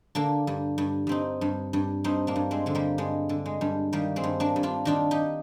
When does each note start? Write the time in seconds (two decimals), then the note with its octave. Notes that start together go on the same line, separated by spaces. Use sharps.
0.15 D3 A#3 D4
0.47 G2
0.78 G2
1.07 G2 C4 D#4
1.41 G2
1.73 G2
2.04 G2 C4 D#4
2.27 A#3 D4
2.36 G2
2.51 G#3 C4
2.66 D3 G#3
2.75 G3 A#3
2.98 G2 G#3
3.29 D3
3.46 G#3
3.61 G2
3.93 D#3 G3 A#3
4.16 G#3 C4
4.23 G2
4.40 A#3 D4
4.56 G2
4.63 D4 F4
4.85 D#3 D4 F4
5.11 D#4 G4